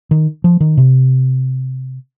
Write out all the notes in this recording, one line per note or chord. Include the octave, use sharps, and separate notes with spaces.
D#3
F3
D#3
C3